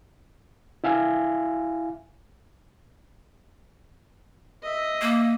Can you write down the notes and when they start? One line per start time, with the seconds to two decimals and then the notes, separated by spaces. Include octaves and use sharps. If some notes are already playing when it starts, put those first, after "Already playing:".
0.84 E4 E5 F5 G#5
4.63 D#5 E5
5.01 A#3